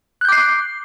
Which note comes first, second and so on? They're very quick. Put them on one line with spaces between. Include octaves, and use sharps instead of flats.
F#6 G6 D6 C7